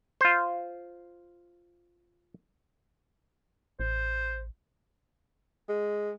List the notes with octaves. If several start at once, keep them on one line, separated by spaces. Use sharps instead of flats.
F4 C5
A1 C5
G#3